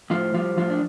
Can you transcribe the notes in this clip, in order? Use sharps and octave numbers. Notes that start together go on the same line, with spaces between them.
A2 F3 F4
F3 G3 F4
A2 F3 F4
D4